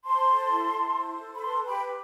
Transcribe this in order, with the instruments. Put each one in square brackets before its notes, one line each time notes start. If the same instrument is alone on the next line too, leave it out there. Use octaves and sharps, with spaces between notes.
[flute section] C5 A5 C6
A4
E4
E4
C5
A4
B5
B4 A5 C6
G4 G5 B5